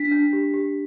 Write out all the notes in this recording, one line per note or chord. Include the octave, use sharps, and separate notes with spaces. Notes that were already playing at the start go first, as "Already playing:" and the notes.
Already playing: D4 B6
D4
G4
G4